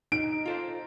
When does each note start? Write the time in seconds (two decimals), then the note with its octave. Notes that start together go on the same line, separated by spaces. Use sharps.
0.12 D#4 D7
0.46 F4 A4 C5